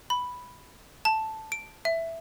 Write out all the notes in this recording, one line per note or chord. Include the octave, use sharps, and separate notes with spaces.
B5
A5
D7
E5